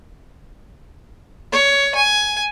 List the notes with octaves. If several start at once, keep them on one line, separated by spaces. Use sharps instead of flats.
C#5
G#5